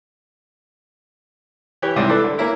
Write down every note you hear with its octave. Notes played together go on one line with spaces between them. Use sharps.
E3 G4 B4 C#5
C#2 G#2 C3 E3 G3
D4 A4 B4
D3
A#3 C#4 E4 A#4